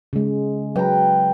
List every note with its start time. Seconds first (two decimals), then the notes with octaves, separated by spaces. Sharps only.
0.13 C#3 G#3
0.76 F#3 B4 G5 A#5